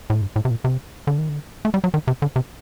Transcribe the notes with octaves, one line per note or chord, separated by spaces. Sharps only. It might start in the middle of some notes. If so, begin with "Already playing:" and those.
A2
G2
A2
C3
A#2
C3
D3
D#3
D3
A3
G3
F#3
D#3
C3
D3
C3